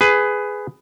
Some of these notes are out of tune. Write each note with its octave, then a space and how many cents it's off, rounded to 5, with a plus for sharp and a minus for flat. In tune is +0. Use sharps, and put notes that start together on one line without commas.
G#4 +0 B4 +15